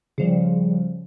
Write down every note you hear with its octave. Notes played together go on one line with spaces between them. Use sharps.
C#3 F3 G3